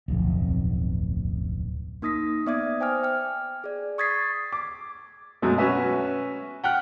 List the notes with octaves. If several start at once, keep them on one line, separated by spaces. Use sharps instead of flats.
D1 B1 F2
A#3 D#4 D#6 A#6 B6
B3 D5 E5 D6 D#6 G#6
C5 G5 G#5 D6 F6
G5 F6
G#4 D5
C#6 D#6 G#6 A6 B6 C7
D6
F#2 B2 F#3 G#3 A3
C#4 F#4 B4 E5 G#5
F#5 G5 F6 F#6